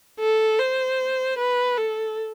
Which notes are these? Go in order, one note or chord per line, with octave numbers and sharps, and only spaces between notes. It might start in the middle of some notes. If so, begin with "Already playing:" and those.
A4
C5
B4
A4